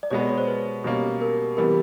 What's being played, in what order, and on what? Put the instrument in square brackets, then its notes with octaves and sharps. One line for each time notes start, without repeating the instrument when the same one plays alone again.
[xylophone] D5
[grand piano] B2 G#3 B3 [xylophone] C#5
[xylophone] D5
C#5
C5
B4
[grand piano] B2 G3 A#3 C#4
[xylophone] A#4
[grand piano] C3 E3 G3 B3 [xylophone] A#4